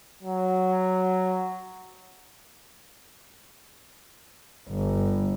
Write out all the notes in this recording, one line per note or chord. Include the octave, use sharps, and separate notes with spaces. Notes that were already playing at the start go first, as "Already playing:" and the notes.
F#3
G1